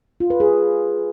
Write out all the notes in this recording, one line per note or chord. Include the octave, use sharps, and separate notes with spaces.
F4
B4
G#4